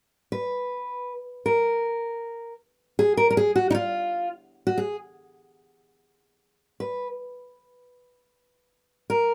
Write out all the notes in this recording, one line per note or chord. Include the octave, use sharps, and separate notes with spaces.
B4
A#4
G#4
A#4
A#4
G#4
F#4
D#4
F4
F#4
G#4
B4
A#4